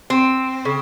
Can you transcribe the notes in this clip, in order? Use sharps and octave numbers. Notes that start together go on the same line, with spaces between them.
C4
C#3